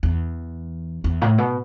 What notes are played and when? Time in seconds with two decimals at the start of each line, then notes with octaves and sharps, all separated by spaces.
0.03 E2
1.04 E2
1.22 A2
1.38 B2